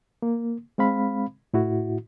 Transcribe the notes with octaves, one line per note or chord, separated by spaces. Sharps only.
A#3
G#3 C4 F5 B5
A2 E4 F#4